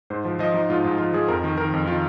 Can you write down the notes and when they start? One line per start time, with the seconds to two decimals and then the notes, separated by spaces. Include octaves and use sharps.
0.10 G#2 C5
0.25 F3
0.39 F3 D#5
0.54 F3 D#4
0.69 G#2 F4
0.84 G#2
0.98 F3 F4
1.14 F3 G#4
1.28 F2 A#4
1.44 D#3
1.57 D#3 A#4
1.73 F2
1.87 D#3 F4